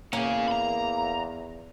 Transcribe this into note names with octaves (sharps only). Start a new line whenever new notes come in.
E2 A#3 C#4 G#4
A#5 B5